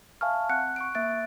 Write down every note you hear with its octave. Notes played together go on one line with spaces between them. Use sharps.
E5 F5 G#5 A5 C#6 F6
C4 F#5 F#6 C#7
C#6 F#6 D7
A#3 E5 F#6 A6 D7